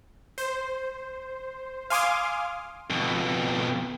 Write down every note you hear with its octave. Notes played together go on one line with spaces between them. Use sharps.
C5
F5 G#5 C6 D6 D#6 F6
F2 B2